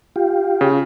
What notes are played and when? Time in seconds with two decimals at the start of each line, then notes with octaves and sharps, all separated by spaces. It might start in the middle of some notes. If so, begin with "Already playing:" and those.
0.16 F4 G4
0.61 C#3